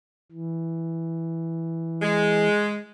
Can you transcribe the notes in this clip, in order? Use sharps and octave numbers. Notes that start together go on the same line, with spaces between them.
E3
G#3